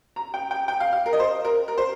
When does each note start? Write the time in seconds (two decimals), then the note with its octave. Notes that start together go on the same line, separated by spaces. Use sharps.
0.16 A#5
0.34 G5
0.51 G5
0.68 G5
0.80 F5
0.93 F5
1.06 A#4
1.13 D#5
1.20 C5
1.45 A#4
1.68 A#4
1.78 C5